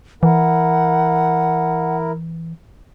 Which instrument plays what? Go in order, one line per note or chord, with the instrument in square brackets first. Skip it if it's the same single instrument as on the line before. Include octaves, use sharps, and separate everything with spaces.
[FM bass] E3 [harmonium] E4 A#4 [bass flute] F#5